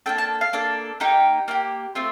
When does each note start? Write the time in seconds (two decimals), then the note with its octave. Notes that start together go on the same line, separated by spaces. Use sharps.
0.06 A#3 D4 A4 G5
0.18 A5
0.41 F5
0.53 A#3 D4 A4
1.00 A#3 D#4 G4 G5
1.48 A#3 D#4 G4
1.95 A3 C4 F4